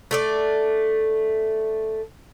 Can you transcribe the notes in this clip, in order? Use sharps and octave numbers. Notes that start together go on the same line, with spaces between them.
A3 D4 D5